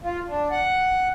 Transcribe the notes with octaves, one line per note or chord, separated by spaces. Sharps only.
F4
D4
F#5